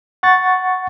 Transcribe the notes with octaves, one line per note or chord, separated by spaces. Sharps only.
F#5 C#6 A6